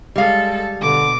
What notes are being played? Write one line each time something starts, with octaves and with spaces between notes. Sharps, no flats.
G3 G#3 A4 F5
B2 D3 D6